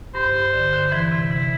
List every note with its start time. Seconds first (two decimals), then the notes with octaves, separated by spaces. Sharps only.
0.15 G2 C5
0.34 G2
0.53 D3
0.73 D3
0.92 E3 E4
1.12 C3
1.31 E3